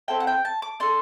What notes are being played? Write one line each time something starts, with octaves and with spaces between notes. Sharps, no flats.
C4 E4 A4 G5
F#5
G5
A5
D6
D4 A4 C6